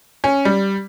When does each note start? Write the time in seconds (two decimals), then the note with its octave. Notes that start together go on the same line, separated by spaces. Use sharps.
0.24 C#4
0.45 G3